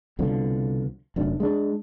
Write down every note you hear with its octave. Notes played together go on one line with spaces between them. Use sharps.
C2 B2 D3 F3
F1 F#2 D4
G#3 B3 D4